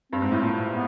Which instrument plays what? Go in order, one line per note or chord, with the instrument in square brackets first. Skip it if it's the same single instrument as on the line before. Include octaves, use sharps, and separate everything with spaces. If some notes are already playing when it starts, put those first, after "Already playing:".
[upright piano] G2 [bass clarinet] C4
[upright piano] G#2
A2
A#2
[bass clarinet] B3